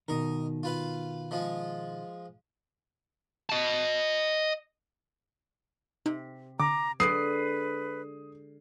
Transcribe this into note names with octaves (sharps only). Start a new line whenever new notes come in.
B2 D#3 A#4 D#5
F4 B4 F5
F3 G#3 F4
D#5 A5
C3 D#4
D3 A#5 D6
D3 F#3 G#3 B4 D5 D#6 C7